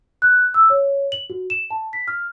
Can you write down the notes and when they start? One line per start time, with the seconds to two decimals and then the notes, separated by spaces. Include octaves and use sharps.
0.22 F#6
0.54 E6
0.70 C#5
1.12 F#7
1.30 F#4
1.50 E7
1.70 A5
1.93 B6
2.08 F6